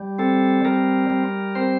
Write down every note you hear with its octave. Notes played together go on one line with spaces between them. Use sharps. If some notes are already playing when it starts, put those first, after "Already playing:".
Already playing: G3
C4 A4
G3 A#4
G3
C4 C5